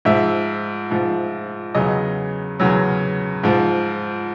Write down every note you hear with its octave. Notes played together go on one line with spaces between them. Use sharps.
G#2 F3 E5
G#2 F3
E2 C#3 F#3 D#5
E2 C#3 F#3
G#2 F3